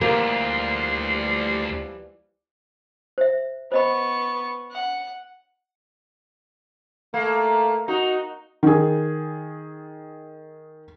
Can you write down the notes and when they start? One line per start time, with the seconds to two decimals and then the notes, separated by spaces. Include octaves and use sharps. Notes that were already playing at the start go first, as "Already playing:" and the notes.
0.01 D2 E3 F3 G3 A#3 C6
3.18 C5 E5
3.72 B3 C5 D#5 B5 C#6
4.71 F#5
7.14 A3 A#3
7.88 D#4 F#4
8.63 D#3 G#4